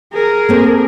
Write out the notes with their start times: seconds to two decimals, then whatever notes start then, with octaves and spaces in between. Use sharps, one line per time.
0.13 G#4 A#4
0.49 A3 A#3 C4